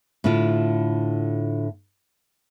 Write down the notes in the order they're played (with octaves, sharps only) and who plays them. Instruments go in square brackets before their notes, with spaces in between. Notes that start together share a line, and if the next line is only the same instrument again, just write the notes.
[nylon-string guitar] A2 D3 E4 F4